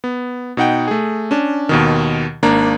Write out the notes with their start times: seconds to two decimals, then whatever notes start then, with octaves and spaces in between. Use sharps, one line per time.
0.04 B3
0.57 B2 D#4 F#5 G5
0.88 A3 G#4
1.31 C#4 D4
1.69 D#2 B2 D#3
2.43 G#1 A#3 D4 A#5